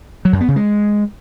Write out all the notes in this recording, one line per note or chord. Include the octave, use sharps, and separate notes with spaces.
F#3
F#2
B3
C#3
G#3